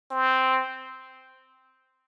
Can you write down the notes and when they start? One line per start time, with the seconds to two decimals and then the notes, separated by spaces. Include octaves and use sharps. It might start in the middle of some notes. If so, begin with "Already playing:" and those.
0.11 C4